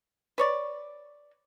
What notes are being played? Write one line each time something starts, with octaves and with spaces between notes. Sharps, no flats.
B4 C#5 D5